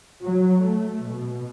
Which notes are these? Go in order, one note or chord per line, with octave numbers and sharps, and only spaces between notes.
F#3
A3
B2